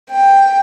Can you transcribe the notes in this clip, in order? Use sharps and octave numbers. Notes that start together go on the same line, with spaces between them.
G5